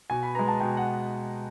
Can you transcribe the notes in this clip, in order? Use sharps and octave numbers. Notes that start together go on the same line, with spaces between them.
B2 G#5
B5
G#3 B3 A#5
A5
B2 G5
F#5